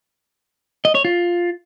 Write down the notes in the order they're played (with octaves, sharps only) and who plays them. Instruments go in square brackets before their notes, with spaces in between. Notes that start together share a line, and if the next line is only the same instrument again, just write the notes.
[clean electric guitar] D#5
C#5
F4